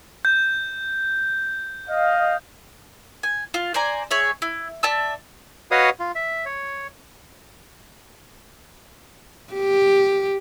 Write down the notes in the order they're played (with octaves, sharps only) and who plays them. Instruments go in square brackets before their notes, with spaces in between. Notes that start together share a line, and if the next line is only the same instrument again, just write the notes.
[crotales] G6
[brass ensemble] D#5 F5
[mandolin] G#5
F4
C5 D5 G#5 A#5
G#4 C#5 E5
E4
D5 E5 A5 E6
[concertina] F#4 B4 C#5 D#5 F5 D#6
F4
E5
C#5
[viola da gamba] G4